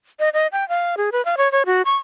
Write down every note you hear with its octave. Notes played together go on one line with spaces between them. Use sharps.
D#5
D#5
G5
F5
G#4
B4
F5
C#5
C#5
F#4
C#6